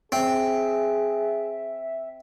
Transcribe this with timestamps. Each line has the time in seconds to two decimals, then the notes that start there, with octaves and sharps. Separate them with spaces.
0.12 C4 G#4 E5